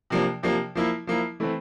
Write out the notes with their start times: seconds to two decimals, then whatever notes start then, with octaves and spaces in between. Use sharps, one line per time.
0.10 C3 F3 A#3 D4
0.43 C3 F3 A#3 D4
0.75 F3 A#3 E4
1.07 F3 A#3 E4
1.40 E3 A3 C4